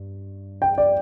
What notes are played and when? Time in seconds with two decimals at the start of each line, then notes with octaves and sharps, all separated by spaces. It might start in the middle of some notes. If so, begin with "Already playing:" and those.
Already playing: G2
0.62 G5
0.78 D5